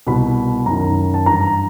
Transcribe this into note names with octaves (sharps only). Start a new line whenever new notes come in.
C2 B2 B5
F#2 D#3 A#5
A5
G2 E3 A#5